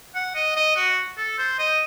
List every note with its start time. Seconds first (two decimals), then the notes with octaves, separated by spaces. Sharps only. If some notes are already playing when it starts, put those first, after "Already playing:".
0.15 F#5
0.35 D#5
0.56 D#5
0.76 F#4
1.17 A4
1.38 C5
1.59 D#5